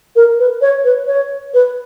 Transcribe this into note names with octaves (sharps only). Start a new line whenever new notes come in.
A#4
B4
C#5
B4
C#5
B4